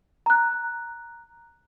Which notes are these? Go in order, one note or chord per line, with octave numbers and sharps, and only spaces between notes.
A#5 F#6